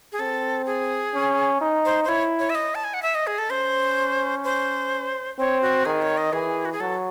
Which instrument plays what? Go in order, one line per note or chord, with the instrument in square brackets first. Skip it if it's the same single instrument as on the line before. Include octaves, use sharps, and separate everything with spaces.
[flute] G#4
[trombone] C4 [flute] A4
[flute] G#4
[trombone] C#4
D#4
[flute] C5
C5
[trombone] E4 [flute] C#5
[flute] C#5
E5
D#5
A5
G#5
F#5
E5
D#5
G#4
A4
[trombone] C#4 [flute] C5
[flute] C5
[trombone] C4 [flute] C#5
[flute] F#4
[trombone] D#3 [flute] G#4
[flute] C#5
D#5
[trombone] E3 [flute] G#4
[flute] F#4
G#4
[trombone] F#3 [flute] A4